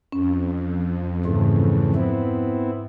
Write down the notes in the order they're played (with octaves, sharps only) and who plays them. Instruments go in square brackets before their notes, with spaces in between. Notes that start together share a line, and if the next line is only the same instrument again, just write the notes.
[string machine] F2 [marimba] C#4
[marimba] G#2 [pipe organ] C#3 E3 A3
[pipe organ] B3 C4 E4